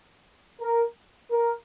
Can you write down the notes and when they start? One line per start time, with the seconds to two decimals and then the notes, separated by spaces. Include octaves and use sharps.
0.61 A#4
1.30 A#4